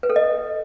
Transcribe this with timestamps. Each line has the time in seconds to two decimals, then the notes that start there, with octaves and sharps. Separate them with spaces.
0.03 B4
0.10 A4
0.16 D#5